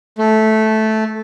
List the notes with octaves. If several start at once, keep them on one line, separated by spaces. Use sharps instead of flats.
A3